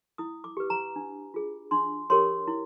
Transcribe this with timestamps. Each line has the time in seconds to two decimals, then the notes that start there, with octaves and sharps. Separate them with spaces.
0.18 E4 D#6
0.44 D6
0.57 G4 B4
0.70 A#5
0.96 D4
1.34 F4 G#4
1.71 D4 C6
2.10 G4 A#4 C#5 C6
2.48 E4